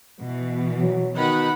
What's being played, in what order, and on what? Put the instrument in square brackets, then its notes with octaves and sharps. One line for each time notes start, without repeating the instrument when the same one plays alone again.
[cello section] B2 E3
[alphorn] F#3
[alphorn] B2 [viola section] D#3 F#5 B5